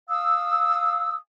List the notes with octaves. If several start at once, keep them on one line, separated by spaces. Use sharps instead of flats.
F5 D#6 E6